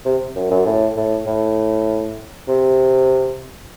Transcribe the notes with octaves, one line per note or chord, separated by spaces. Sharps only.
C3
F#2
F#2
A2
A2
A2
C3